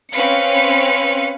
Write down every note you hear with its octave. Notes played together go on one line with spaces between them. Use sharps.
C4 C#4 B4 F5 C#7